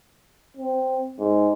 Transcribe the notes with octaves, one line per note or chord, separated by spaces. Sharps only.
C4
G#2